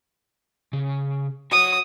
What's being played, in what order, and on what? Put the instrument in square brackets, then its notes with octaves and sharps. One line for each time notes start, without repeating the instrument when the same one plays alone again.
[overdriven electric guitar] C#3
[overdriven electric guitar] F#4 C#5 [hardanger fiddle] D#6